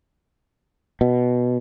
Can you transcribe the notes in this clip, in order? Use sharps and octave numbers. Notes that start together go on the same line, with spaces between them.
B2